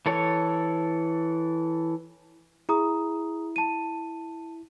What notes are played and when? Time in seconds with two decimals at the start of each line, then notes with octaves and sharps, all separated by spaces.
0.06 E3 A4 C#5
2.69 E4 G#4 A#5 D#6
3.56 A5 D#7